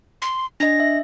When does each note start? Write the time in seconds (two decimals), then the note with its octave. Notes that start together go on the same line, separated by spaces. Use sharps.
0.22 C6
0.60 D4 D#5 A#6
0.80 E5